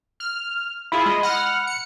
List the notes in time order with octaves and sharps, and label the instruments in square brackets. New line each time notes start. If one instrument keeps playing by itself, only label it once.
[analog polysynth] F6
[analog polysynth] E4 F4 G#4 [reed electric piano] B5
[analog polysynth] G#3 D#5
F#5 F6
C#7